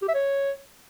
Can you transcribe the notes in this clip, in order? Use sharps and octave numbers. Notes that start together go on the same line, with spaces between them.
G4
E5
C#5